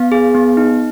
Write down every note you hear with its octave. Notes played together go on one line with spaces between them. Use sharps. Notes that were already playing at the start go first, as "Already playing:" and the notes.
Already playing: B3 F5
G#4
B3
D#4